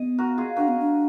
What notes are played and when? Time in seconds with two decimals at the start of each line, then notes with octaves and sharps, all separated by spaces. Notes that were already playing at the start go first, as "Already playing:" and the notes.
Already playing: B3 G#4 D#5
0.19 F#4 A#4
0.38 F4 G#4
0.56 D4 F#4 A#4
0.68 B3
0.80 D4